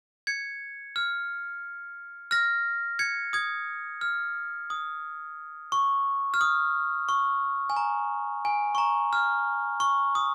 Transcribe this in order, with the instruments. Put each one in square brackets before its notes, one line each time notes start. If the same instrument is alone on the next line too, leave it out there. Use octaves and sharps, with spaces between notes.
[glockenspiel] G#6 C#7
F6
F6 A#6
G#6 C#7
D#6 G#6
F6
D#6
C#6
F6
D#6
C#6
G#5
A#5
G#5
C#6
A#5
F6
C#6
D#6